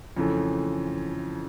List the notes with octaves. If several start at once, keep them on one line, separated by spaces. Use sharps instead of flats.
F2 C#3 E3 A3